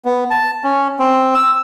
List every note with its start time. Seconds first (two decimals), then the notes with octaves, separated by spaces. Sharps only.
0.05 B3
0.30 A5
0.64 C#4
0.99 C4
1.35 E6